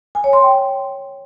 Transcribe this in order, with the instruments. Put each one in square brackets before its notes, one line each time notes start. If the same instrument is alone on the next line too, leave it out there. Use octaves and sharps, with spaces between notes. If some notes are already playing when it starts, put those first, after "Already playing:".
[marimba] G#5
C#5
C6
G5